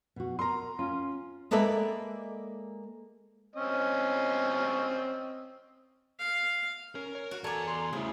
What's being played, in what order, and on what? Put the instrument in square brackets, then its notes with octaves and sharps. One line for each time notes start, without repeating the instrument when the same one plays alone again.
[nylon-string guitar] B2 F#4
[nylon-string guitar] A#4 [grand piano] A#5 C6
[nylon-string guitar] C#4 [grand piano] F4
[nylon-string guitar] G#3 A#3 A4 B4 D5 E5
[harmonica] C4 C#4 D#5
[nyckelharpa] F5
[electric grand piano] C#4 [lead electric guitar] A#4
[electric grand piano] C#5
[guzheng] F#4
[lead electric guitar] E2 A#5 [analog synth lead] A4 [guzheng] C#5 G#5 [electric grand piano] D5 D6
[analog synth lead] C6
[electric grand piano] C#3 G3 E4 [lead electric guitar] A3 C5 [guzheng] G#4